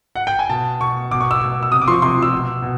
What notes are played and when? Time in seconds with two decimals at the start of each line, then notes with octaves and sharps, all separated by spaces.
0.15 F#5
0.27 G5
0.39 G#5
0.49 B2 A5
0.80 B2 C#6
1.11 B2 D6
1.21 C#6
1.31 E6
1.41 B2 E6
1.63 E6
1.72 C3 D#6
1.81 D6
1.87 F3 C6
1.92 C#6
2.02 C3 C6
2.17 F3
2.22 E6
2.32 B2
2.62 B2